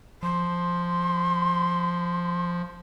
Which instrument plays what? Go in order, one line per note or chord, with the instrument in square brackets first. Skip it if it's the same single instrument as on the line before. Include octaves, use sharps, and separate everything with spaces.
[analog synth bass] F3 [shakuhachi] C6